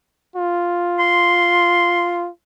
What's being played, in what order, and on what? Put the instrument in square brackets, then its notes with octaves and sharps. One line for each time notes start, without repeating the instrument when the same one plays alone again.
[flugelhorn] F4
[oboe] C6